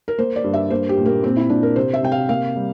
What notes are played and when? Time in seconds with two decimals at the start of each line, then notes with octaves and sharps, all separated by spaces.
0.08 A#4
0.18 A#3 C5
0.36 D5
0.44 G2
0.54 E5
0.70 A#3 C5
0.89 G4
0.98 A#2
1.06 A#3
1.23 A#2 C4
1.37 E4
1.50 A#2 D4
1.63 A#4
1.76 C3 C5
1.94 E5
2.03 C3 G5
2.12 F5
2.29 A#3 F5
2.56 G3